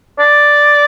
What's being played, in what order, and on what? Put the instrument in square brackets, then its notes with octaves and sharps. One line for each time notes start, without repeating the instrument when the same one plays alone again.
[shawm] D5